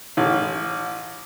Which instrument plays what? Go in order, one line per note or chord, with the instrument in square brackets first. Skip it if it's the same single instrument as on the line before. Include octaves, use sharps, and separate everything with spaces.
[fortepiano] A1